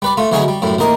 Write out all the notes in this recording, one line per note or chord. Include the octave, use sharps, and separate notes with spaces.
G3 B4 D5
A3 F4
D2 E3 F#3 C#4 G#4 D#5
G3
F#2 A2 G3
A1 D#2 A#4 D#5